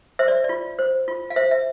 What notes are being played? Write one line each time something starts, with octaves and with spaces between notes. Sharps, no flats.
C5 E5
D5
D5
F4
C5
F4
F5
C5 E5
E5